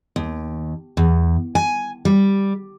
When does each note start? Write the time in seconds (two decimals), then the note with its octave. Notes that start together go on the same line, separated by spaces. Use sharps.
0.16 D#2
0.97 E2
1.55 G#5
2.05 G3